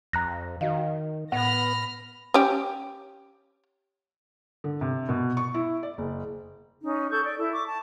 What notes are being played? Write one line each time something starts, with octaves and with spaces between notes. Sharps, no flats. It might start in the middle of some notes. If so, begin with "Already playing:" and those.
F2 A#5 F#6 A#6
D#3 F#4 D#5 F5
A2 B3 F#5 B5 F6 A#6
C#4 G4
D3
C3
B2
C#6
E4
D5
F#1
C#4 D#4
A4 C#6 G6
D5
E4 A4
C#6 D6
A5